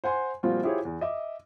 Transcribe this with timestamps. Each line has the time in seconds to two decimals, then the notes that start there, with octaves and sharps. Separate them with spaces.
0.04 C5 F#5 G#5 C6
0.43 A#2 F3 G3 C4 F4 F#4
0.63 E4 F4 G4 G#4 C5 C#5
0.85 E2
1.01 D#5 E5 D6